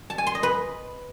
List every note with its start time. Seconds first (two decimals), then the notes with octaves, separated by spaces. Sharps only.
0.10 A5
0.18 G#5
0.27 C6
0.35 D#5
0.43 B4